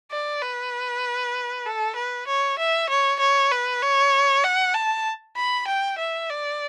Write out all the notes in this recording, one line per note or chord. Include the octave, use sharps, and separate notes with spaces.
D5
B4
A4
B4
C#5
E5
C#5
C#5
B4
C#5
F#5
A5
B5
G5
E5
D5